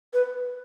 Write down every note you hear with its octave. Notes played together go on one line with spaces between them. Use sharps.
B4